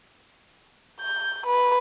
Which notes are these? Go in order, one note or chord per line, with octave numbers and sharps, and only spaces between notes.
G6
B4